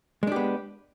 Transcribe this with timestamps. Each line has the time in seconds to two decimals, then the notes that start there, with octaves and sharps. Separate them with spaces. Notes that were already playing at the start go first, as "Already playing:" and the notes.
0.23 G#3
0.27 D4
0.32 G4
0.36 B3